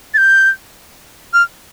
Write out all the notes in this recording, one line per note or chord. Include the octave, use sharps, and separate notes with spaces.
A6
G6
F6